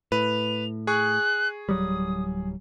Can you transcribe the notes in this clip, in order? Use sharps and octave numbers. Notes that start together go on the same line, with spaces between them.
A2 B4 F7
G#4 C#6 F#6
D1 F#3 G3 D#6